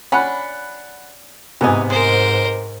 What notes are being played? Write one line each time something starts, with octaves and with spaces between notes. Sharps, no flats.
C#4 D4 F#5 B5
G#2 C3 E3 B3 D#4 G#5
G#3 A#4 C5